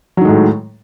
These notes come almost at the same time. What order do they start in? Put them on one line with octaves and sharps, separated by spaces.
F#3 D#3 G#3 A2